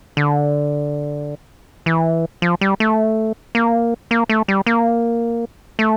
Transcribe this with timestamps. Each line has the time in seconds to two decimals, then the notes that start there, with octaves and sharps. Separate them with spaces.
0.17 D3
1.86 E3
2.42 F3
2.61 G3
2.80 A3
3.55 A#3
4.11 A#3
4.29 A3
4.48 G3
4.66 A#3
5.79 A3